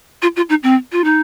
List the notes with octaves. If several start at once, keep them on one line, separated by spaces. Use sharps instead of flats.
F4
F4
D#4
C4
F4
D#4